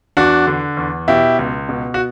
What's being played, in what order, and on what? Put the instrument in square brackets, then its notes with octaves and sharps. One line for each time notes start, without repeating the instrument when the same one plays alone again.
[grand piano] E2 D4 F#4
D3
E2
B2 E4 G4
C#2
B2
F#4